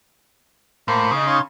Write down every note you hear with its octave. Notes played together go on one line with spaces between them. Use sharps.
A2 A#3 C5
C#3 D#4 D#6
C#5 F5 C6